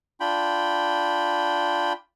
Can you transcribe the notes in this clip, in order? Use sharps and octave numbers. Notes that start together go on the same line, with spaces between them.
D4 F4 G5 B5